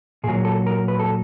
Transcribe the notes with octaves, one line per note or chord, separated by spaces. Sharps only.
A#2 F#3 G#4
A4
A#4
B4
A4